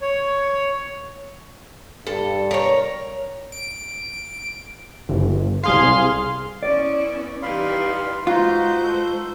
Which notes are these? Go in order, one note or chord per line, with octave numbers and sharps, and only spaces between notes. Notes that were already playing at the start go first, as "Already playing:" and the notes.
C#5
G2 A4
A#4 C#5
D7
G1
C2 G#4 F5 C6
B3 C#4 E4 D5
E3 G3 D#4 F5 B5 C6
G#3 D#4 F4 F#4 B4 C5 G6
A4